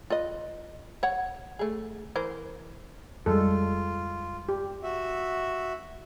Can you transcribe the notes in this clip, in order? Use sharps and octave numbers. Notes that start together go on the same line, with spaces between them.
F4 B4 D#5
C#5 F#5
A3 G#4
E3 A#4 C5
F2 G3 G#3 F4 A4
G4
F#4 E5